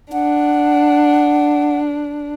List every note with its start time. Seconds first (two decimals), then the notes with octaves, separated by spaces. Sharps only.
0.13 D4 F#5